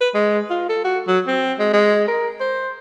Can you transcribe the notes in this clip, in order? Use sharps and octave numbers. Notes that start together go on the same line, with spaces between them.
B4
G#3
F4
A4
F#4
F#3
C4
G#3
G#3
A#4
C5